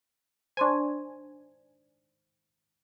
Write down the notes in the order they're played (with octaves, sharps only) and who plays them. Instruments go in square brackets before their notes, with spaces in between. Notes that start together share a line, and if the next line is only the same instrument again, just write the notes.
[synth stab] D4 G#5 [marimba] C5 C6 C#6